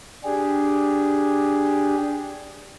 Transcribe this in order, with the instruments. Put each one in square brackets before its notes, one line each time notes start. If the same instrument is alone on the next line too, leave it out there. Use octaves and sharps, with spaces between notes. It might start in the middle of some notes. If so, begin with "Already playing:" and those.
[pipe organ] D4 G4 G#4